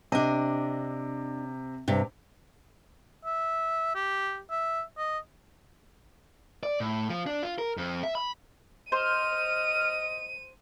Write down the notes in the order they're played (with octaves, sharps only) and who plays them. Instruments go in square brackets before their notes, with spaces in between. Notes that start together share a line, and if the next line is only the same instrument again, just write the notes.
[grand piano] C3 [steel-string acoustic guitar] D4 D#5
[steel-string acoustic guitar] G2 C3
[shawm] E5
G4
E5
D#5
[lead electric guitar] D5
A2
F3
D4
F4
A#4
F2
E5
B5
[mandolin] C5 [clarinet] D#5 [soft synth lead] F6 [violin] D#7